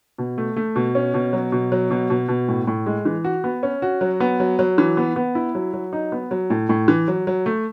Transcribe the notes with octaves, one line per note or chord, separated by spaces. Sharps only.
B2
A3
A3
B2
C#4
B2
F#3
B2
F#3
B2
B2
B2
A2
A2
G#3
E3
F#4
B3
C#4
F#4
F#3
B3
F#3
F#3
E3
B3
B3
E4
F#3
F#3
D#4
B3
F#3
A2
A2
E3
F#3
F#3
A3